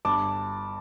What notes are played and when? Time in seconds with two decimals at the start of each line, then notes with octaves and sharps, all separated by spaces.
0.05 G1 A5 D6